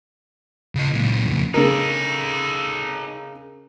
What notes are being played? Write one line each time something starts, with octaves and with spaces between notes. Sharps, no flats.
C#3 D#5
C#2 A#2
F2 C#3
C#3 D#4 A4 A#4